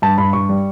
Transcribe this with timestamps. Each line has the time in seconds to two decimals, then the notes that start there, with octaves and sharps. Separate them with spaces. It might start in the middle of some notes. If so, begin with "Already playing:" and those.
0.02 G2 A5
0.18 G2 B5
0.33 G2 C#6
0.49 G3